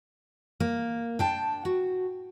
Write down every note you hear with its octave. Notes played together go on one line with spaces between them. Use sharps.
A#3
D4 G5 A5
F#4